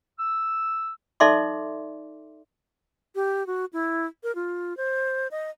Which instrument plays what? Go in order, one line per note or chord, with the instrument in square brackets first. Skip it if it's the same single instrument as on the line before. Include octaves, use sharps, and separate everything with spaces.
[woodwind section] E6
[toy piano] D#4 A4 D5 E5 C6 D6
[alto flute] G4
F#4
E4
A#4
F4
C5
D#5